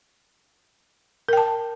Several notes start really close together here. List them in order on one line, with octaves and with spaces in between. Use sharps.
A#4 G5 A5